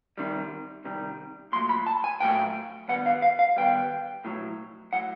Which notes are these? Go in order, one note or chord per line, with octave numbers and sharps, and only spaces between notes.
C2 C3 D#3 G3
C2 C3 D#3 G3
A#2 F#3 A3 C6
B5
A5
G#5
A#2 F#3 A3 G5
G2 D#3 G3 B3 F#5
F5
F5
F5
G2 D#3 G3 B3 G5
B1 A2 F#3
A2 F#3 F#5